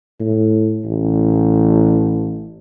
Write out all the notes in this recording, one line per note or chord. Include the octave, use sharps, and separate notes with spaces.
A2
A1